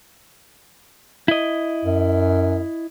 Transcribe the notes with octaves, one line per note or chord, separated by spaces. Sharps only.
E4 D#5
F#2